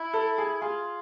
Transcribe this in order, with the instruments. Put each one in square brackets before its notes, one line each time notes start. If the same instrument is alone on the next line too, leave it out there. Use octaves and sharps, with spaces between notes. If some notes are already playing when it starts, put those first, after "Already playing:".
Already playing: [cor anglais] E4
[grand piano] A4
G#4
[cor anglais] F4 [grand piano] G#4